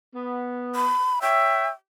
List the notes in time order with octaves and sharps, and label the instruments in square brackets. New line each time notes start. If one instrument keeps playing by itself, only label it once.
[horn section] B3
[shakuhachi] B5
[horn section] C#5 E5 [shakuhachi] G5